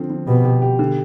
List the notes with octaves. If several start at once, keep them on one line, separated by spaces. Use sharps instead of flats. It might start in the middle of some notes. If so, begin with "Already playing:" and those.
Already playing: D3 F3 C4
D3
B2 G4
G4
G4
D3